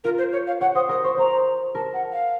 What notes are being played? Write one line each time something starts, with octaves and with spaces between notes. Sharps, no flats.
F4 A#4
C5
C#5
F5
C#5 F#5
C5 D#6
A#4 D#6
C5 C#6
C5 A#5
A#4 A5
F#5
F5